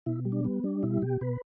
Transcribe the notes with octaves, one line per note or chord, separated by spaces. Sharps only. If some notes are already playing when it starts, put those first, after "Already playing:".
B2 E4
G3
D4
G3 B3
G3 D4
B2 E4
B2 G4
B2 B4